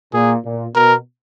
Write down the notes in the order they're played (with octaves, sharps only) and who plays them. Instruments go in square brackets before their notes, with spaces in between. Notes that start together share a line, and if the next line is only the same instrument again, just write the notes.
[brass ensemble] A#2 [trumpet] G#4
[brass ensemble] A#2
[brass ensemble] B2 [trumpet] A#4